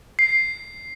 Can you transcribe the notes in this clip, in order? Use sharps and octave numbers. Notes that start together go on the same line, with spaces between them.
C7